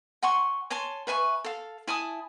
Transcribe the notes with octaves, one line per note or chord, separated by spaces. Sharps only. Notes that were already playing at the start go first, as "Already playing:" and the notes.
F#5 G#5 C6 C#6
C#5 G#5 A5 C6
B4 E5 G#5 C#6
A4 F5
E4 G#5 A5 D#6